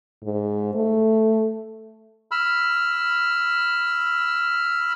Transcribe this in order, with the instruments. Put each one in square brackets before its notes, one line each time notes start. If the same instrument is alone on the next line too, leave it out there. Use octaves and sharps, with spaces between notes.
[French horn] G#2
A3
[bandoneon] B5 E6 F6